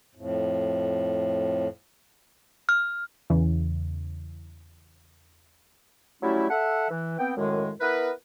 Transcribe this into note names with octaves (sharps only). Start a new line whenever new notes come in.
F2 A2
F6
E2 C#3 E3
F#3 G3 A3 C#4 E4
A4 E5 F#5
E3
B3 C4 G5
F#2 A2 D#3 G#3
B3 E4 A#4 B4